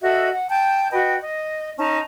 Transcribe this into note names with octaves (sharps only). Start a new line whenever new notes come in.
F#4 A4 D#5 E5
F#5
G5 A5 G6
F#4 B4 D#5 G5
D#5
C#4 D#4 A5